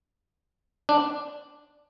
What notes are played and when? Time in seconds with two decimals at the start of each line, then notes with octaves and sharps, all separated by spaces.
0.89 D4